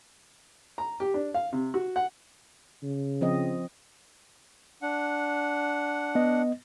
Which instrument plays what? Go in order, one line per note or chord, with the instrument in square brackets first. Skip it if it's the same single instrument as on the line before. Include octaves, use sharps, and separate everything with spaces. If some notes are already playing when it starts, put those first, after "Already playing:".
[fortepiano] A#5
G4
D4
F5
C3
F#4
F#5
[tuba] C#3
[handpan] F3 C4 D#5
[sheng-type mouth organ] D4 F#5
[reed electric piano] B3 D#5